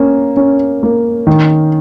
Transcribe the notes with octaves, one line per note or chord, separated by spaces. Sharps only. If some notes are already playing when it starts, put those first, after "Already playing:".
Already playing: A#3 C#4
C#4
A#3
D#3